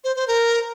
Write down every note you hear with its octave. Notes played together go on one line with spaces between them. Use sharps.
C5
C5
A#4